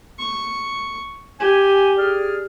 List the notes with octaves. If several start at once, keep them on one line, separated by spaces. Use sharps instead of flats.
C#6
G4 G#5
G#4 D5 F6